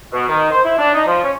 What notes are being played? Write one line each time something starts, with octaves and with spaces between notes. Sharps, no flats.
B2
D#3
C5
E4
D4
D#4
F3
C#4